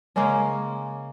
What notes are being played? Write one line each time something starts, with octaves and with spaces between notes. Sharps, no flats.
C#3 G#3 A#3 C#4